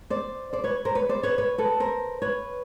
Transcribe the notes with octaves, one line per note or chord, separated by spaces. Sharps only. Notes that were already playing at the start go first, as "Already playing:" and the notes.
C5 D5
C5 D5
B4 C#5
A#4 C5
B4 C#5
C5 D5
B4 C#5
B4 C#5
A4 B4
A#4 C5
B4 C#5